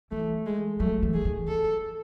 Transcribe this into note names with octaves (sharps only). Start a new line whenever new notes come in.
E3 A3
G#3
F#3 A3
E3
G#4
D#3
D#3 A4